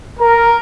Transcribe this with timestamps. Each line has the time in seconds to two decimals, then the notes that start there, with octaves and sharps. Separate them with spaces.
0.19 A#4